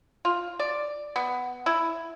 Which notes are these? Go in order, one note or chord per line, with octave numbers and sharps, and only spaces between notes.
F4
D5
B3
E4